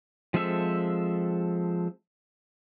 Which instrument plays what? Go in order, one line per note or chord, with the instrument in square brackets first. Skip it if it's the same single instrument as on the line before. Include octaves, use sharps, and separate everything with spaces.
[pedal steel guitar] F3 G#3 C4 A4 E5